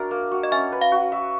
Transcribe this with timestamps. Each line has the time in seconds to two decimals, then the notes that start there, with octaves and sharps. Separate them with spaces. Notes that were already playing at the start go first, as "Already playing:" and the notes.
Already playing: D4 F#4 A#4 E5
0.11 A#3
0.31 F#4
0.43 D#5
0.51 C#4 E5
0.72 B4
0.82 F5
0.92 F#4
1.12 E5